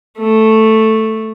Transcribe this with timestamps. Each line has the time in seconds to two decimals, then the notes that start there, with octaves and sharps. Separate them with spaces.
0.18 A3